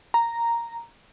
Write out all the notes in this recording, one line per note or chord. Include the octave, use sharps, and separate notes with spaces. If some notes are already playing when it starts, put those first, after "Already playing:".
A#5